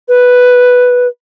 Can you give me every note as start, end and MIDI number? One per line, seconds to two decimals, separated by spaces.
0.09 1.07 71